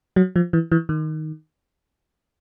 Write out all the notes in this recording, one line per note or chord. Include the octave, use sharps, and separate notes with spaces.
F#3
F3
E3
E3
D#3